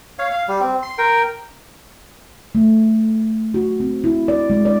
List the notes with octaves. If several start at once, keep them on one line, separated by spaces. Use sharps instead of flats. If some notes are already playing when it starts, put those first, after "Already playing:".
C#5 F5
F5
G3
C4
C6
A#4 G5
A3
F#4
C4
E4
D5
G#3
D5